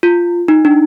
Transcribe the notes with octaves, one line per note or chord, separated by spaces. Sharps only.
F4
D#4
D4